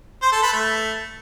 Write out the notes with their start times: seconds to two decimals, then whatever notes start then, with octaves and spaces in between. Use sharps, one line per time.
0.22 C5
0.32 A4
0.43 B4
0.53 A3